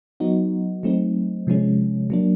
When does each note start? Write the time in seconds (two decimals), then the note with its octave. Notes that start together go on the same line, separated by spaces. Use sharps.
0.20 F#3 B3 D#4 F#4
0.83 F#3 A3 C4 D#4
1.47 C3 F3 G#3 C#4
2.10 F#3 A#3 D4